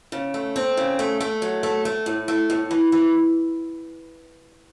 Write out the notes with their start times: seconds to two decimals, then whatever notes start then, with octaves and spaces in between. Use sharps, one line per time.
0.12 C#3
0.34 A3
0.56 C4
0.77 C#3
0.99 A3
1.20 A3
1.42 F#3
1.63 A3
1.85 A3
2.06 A2
2.28 A3
2.50 A2
2.71 E3
2.92 E3